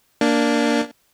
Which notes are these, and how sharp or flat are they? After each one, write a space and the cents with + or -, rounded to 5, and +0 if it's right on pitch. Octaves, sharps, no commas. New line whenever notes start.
A#3 +0 D4 +0